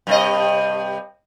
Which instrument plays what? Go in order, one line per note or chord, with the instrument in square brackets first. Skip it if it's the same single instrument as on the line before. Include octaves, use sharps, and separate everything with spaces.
[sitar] G2 C3 D#5